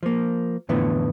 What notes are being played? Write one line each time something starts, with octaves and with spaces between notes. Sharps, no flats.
F3 A#3
F2 A2 D3 E3 B3